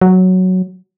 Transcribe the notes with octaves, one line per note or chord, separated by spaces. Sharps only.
F#3